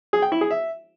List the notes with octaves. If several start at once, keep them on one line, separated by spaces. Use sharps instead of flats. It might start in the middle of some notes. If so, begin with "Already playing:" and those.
G#4
G5
E4
G#4
E5